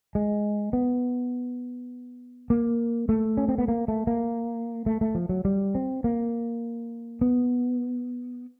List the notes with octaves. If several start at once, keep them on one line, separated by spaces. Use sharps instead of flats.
G#3
B3
A#3
A3
C#4
C4
B3
A#3
A3
A#3
A3
A3
F3
F#3
G3
C4
A#3
B3